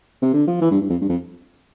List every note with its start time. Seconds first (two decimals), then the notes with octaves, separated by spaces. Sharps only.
0.22 C3
0.33 D3
0.47 F3
0.61 E3
0.71 G2
0.81 G2
0.89 F2
1.01 G2
1.09 F2